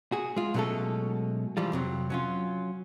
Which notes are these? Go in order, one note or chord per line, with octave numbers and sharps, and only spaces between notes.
F#4 G#4
G#3 F4
B2 F#3 G#3 A3 C#4 A4
E3 F3 G3 F4
F2 C3 F#3
F#3 C#4 F4